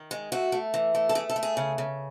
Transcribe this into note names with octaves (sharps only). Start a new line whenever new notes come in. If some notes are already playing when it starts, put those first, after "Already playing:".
Already playing: D#3
G#3
A3 F#4
A3
E3
A3
A4
A3 G#4
A4
A3
G#4
C#3
C#3